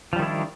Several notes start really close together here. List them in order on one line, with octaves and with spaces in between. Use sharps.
F3 G3 D#3 E4 D4